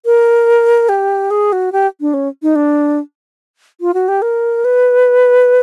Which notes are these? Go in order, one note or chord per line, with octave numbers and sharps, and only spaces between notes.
A#4
G4
G#4
F#4
G4
D4
C#4
D#4
D4
F4
F#4
G4
A#4
B4